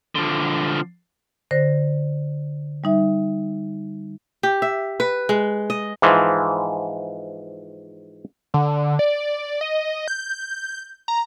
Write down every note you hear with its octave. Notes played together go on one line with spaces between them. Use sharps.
D3 F3
D3 C5 A#6
G3 D#4 E5
G4
E5
B4
G#3
D#5
G#2 E3 F3
D3
D5
D#5
G6
A#5